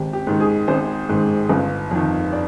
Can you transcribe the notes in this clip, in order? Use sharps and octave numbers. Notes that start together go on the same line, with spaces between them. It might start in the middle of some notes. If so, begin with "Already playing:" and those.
Already playing: G#1 G4
G4
G#2 D#3
G#4
G#1 C5
G#2 D#3
G1
F2 D#3
D5